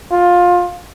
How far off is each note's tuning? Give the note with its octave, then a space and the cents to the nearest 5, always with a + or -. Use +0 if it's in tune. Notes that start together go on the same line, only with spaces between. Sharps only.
F4 +20